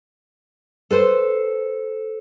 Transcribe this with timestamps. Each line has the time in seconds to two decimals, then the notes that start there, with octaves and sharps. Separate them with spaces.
0.91 A4 B4 C5